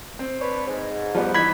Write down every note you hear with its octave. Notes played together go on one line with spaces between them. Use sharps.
C4
D4 B4 C#5
G#2
F3 G3 B3
E3 D#4 B5 G#6 B6